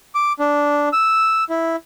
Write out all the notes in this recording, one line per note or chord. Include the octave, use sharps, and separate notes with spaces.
D6
D4
E6
E4